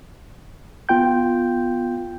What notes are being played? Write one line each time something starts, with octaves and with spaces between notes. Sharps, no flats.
B3 F4 G5 G6